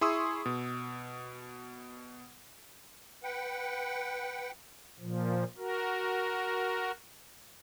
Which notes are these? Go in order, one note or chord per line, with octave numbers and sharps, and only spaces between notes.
E4 G#4 C6 C#6 D#6 E6
B2
B4 F#5 G5
A#2 F3
F#4 A#4